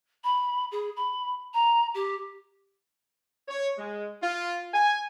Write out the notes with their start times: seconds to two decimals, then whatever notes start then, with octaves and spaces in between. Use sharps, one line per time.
0.23 B5
0.71 G#4
0.96 B5
1.53 A#5
1.94 G4
3.48 C#5
3.78 G#3
4.22 F4
4.74 G#5